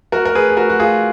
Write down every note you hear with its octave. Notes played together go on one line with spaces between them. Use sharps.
F#4 A#4
A#4
G#4 B4
G#4
F#4 A#4
F#4
F4 G#4